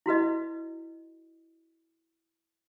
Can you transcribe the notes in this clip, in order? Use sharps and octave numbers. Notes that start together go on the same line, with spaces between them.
E4 F#4 B4 D#5